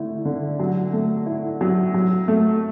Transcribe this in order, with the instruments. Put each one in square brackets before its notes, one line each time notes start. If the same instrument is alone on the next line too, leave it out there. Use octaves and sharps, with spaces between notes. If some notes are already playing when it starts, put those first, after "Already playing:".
Already playing: [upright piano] D3 A3 E4
D3
F#3
A3
E4
F#3
F#3
A3